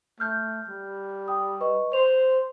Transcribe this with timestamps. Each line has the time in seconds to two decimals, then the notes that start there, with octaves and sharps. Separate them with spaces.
0.20 A3 F6 G6
0.69 G3
1.28 G5 D#6
1.61 B4 D#5 C#6
1.93 C5 F7